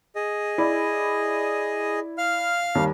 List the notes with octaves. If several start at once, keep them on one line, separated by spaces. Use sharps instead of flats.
G#4 D#5
E4 D5
F5 F6
D#2 G3